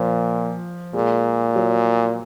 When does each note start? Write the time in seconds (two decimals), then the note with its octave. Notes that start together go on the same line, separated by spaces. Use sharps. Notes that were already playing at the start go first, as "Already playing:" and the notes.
Already playing: A#2 F3
0.94 A#2 G#3
1.56 F#3